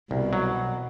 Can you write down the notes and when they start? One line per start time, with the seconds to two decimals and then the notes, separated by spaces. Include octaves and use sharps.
0.11 C2 B2
0.33 F#3